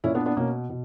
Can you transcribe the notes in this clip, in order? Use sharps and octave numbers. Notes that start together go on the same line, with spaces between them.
A#2 C#4 E4
B3 D4
B3 D4
B2 A#3 C#4
B2